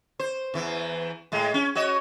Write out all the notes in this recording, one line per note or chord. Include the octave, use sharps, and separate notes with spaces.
C5
E2 E3
A2 G#3
C#4
F#4 C#5 D#5